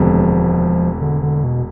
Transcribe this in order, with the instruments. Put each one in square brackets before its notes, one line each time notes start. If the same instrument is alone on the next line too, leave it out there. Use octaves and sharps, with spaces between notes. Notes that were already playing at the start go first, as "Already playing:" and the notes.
Already playing: [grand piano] E1 D2 C3 G#3 [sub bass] F3
[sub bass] D3
D3
B2